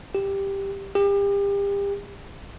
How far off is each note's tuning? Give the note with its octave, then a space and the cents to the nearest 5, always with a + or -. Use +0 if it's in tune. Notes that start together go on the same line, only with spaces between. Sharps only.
G4 +5
G4 +35